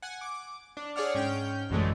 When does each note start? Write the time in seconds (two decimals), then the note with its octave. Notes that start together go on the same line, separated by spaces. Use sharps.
0.02 F#5 G#5
0.21 D6
0.77 D4
0.96 G#4 C#5 D5 F#5 F6
1.14 G#2 C#4 G5 F6 G6
1.70 A1 F#2 D3 E3 G#3 A3